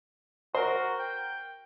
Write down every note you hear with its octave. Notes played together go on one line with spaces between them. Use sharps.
F#4 A#4 C5
G5